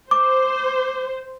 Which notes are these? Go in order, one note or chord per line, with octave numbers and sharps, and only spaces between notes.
C5 D6